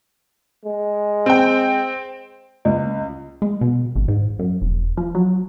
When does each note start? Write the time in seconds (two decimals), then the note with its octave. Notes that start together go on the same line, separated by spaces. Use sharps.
0.65 G#3
1.26 C4 G5
2.65 C#2
3.42 G#3
3.61 B2
3.96 G#1
4.08 G#2
4.39 F#2
4.62 E1
4.97 F3
5.15 F#3